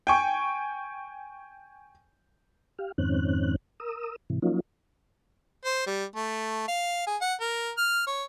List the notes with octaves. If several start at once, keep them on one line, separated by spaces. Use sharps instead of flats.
G5 G#5 C#6
G4 F5
F2 G#2 D#3 C4 C#4 F#6
A#4 D#6 E6
G#2 C3 E3
F3 F#3 A#3 C#4 D#4 F4
C5
G3
A3
F5
G#4
F#5
A#4
F6
C#5